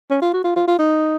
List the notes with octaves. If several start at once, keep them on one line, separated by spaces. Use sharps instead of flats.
C#4
F4
F#4
F4
F4
F4
D#4